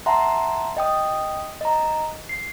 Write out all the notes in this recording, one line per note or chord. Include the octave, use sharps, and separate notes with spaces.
E5 F#5 A5 A#5 C6
D#5 G5 D#6
D#5 A#5
C7